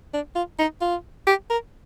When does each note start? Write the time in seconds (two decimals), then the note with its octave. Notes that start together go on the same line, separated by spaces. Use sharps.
0.14 D4
0.35 F4
0.59 D#4
0.81 F4
1.27 G4
1.50 A#4